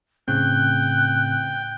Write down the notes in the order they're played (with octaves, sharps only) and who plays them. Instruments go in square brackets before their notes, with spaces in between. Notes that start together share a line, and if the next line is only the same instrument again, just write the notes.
[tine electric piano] A2 C#3 C4 [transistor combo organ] G5 [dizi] F#6